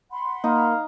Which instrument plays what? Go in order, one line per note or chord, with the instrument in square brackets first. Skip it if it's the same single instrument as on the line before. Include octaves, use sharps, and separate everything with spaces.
[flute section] F#5 B5 C6
[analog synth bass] A#3 [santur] D#4 [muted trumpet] F5